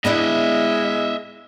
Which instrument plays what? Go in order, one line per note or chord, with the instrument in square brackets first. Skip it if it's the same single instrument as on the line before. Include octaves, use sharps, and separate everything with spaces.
[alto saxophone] G#3 [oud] B3 D4 E4 [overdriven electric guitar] D#5 E5